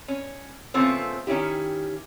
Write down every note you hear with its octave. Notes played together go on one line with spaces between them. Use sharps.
C#4
C#3 F3 A3 B3 C4
D#3 C#4 E4 G4